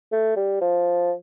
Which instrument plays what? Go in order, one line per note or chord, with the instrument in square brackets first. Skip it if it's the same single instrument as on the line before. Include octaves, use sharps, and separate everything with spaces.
[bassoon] A3
G3
F3